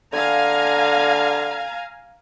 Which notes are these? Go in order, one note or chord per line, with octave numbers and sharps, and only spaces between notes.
D3 F5 G#5 A#5